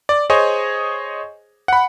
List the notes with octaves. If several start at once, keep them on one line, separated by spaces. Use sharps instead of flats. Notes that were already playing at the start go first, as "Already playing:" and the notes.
D5
G#4 C5 C#5 D#5 G#5
F#5 B5